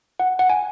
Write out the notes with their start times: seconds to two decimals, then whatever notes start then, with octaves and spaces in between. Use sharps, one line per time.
0.20 F#5
0.39 F#5
0.50 G#5